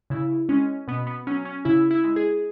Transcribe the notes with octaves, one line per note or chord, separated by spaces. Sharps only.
C#3 E4
G#3 C#4
B2 B3
B3
F#3 C#4
C#4
C#3 E4
E4
G#3
G#4